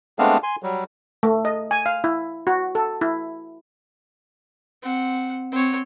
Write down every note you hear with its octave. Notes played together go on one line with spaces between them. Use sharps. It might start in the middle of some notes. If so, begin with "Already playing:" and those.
G#3 A3 B3 C4 D4 F5
G#5 C6
F#3 G3
A3
D#5
G#5
F5
E4
F#4
A4
E4
C4 F#5
C4 C#5